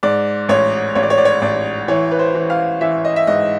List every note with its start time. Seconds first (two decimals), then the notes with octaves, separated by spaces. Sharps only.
0.03 G#2 D5
0.49 A1 C#5
0.95 A1 C#5
1.03 D5
1.10 C#5
1.18 D5
1.25 C#5
1.42 A1 D5
1.88 E3 C#5
2.11 B4
2.19 C5
2.34 E3
2.50 F5
2.81 E3 E5
3.04 D#5
3.16 E5
3.27 G#2 D#5